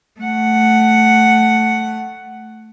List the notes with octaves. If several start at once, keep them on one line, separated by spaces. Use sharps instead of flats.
A3 F#5